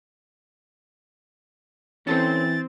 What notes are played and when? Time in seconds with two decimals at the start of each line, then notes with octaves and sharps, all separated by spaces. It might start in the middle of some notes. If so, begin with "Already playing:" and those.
2.07 E3 C4 C#4 A4 C5 A6